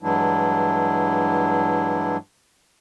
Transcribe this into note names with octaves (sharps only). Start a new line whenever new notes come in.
G2 E3 F#3 G#3 D4 E4